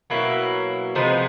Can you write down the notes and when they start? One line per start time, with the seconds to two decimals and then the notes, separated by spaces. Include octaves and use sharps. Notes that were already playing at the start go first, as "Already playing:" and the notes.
0.10 B2 F#3 A#3 E4
0.95 C3 F3 G#3 B3 D#4